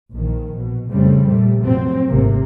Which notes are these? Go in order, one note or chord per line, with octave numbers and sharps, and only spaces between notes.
A#1 D#3
B2
F2 C#3 G3 A3 C4
A#2 G3 A3
A2 C3 F3 F#3 C4
G#1 C3 A3 A#3